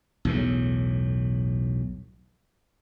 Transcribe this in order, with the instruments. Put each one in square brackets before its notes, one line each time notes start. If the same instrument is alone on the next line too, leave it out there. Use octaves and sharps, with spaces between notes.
[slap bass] B1 E2 A2